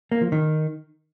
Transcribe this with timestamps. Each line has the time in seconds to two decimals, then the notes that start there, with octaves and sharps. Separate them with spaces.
0.12 A#3
0.22 F3
0.32 D#3